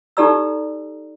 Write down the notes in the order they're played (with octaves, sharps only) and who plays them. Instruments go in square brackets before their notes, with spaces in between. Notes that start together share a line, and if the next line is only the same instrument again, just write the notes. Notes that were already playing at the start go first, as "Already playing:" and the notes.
[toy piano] D#4 G4 A4 D5 A#5 E6